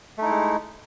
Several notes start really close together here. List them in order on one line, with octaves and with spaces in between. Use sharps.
A3 D#4 E4 G#3